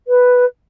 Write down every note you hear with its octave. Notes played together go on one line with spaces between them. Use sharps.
B4